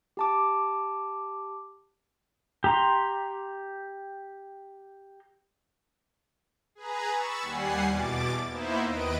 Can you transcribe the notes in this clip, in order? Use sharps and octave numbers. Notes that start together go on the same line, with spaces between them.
G4 A5 D6
G4 A#5 C6
G#4 B4 A#5
B5 C#6 E6 A6
D#2 G3 F#5 G#5 C7
E2 B2 D6 A6
A#3 B3 D#4 E4 C5 E5
D#2 B4 D#5 D7